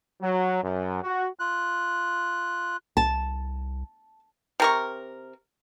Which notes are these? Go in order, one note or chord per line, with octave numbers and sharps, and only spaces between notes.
F#3
F#2
F#4
F4 F#6
C2 A5
C3 A#4 C#6